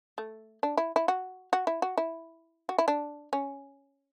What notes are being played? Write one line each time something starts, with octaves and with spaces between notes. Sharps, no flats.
A3
D4
E4
E4
F#4
F#4
E4
F#4
E4
F#4
E4
D4
C#4